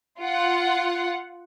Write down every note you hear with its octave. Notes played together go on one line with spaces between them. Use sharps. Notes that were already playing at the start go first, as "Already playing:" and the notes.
F4 F#5